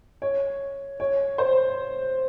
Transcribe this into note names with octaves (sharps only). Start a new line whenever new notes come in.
C#5
C#5
C5